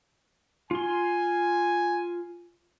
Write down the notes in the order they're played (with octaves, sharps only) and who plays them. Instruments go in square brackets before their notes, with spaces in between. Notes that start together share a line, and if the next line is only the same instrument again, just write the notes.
[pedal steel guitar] F4 C6 [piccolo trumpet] G#5